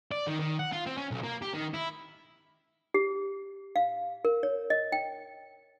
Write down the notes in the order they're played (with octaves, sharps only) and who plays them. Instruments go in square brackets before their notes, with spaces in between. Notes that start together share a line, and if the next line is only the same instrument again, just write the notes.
[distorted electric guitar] D5
D#3
D#3
F#5
F4
C4
C#4
B1
A#3
G4
D#3
E4
[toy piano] G4
F5
A#4
C#5
D#5
G5